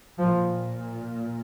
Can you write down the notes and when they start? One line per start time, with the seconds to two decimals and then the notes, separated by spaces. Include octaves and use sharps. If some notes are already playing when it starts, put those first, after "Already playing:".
0.19 A#2 F3